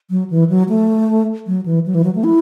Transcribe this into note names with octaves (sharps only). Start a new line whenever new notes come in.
F#3
E3
F#3
A3
F#3
E3
F#3
E3
F#3
A3
E4